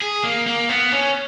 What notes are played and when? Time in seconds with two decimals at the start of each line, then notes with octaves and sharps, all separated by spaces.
0.02 G#4
0.23 A#3
0.47 A#3
0.69 B3
0.92 C#4